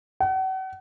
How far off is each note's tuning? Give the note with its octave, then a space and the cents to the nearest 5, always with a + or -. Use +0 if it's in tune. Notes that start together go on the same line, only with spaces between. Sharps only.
F#5 +40